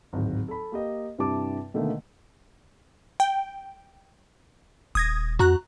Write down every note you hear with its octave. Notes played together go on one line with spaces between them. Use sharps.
D1 G#1
A4 B5
A#3 G4 D#5
G2 C3 G3 E4 A5 D6
B2 D3 D#3 A3 A#3
G5
D#1 D#6 G#6 A#6
F2 F#4 A#5 F#6